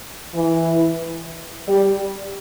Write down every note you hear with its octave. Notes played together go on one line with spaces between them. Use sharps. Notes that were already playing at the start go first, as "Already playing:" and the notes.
E3
G3